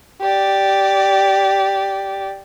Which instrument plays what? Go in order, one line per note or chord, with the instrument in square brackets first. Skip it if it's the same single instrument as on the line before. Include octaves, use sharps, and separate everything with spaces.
[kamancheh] G4 D5